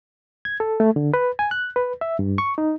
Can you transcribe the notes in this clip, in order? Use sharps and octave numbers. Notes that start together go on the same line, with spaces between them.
G#6
A4
A3
D3
B4
G#5
F#6
B4
E5
G2
C#6
D#4